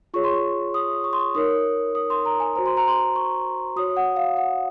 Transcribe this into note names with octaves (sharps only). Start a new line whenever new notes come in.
F4 G#4 C#5 C#6
C6
C#6
D#6
C#6
C6
C#6
D#4 A#4 C#5 D#6
D#6
C6
A#5
G#5
F#4 C5 A#5
C6
A#5
C6
A#5
C#6
F#4 C#5 D#6
F#5
F5
F#5